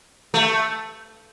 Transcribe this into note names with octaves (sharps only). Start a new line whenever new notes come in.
A3